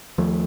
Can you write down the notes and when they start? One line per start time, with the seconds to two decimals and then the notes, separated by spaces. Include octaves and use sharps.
0.18 D#2 F3 A3